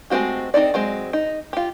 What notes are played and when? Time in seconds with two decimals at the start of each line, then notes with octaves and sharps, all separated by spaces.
0.10 G#3 A3 C4 F#4 G4
0.54 C4 D#4 A4 D5
0.74 F#3 G#3 C4
1.13 D#4
1.53 F4 G4